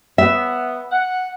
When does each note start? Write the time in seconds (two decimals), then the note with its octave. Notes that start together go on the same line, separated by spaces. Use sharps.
0.18 B3 E5
0.91 F#5